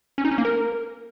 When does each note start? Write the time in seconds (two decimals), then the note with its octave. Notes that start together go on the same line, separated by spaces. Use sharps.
0.18 C#4
0.25 D#4
0.31 C#4
0.38 A#3
0.45 A#4